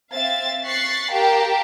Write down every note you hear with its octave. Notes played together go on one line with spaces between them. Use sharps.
C4 E5 F5 A6
C#6 F#6 A6 B6 C7
G4 A#4 F5 G5 A5